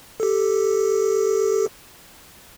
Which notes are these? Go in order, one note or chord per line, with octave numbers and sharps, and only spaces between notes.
G4 A4